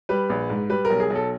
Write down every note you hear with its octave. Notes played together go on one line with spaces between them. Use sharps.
G3 B4
A#1
G#2
G3 B4
A#4
B1
G#4
B1
A4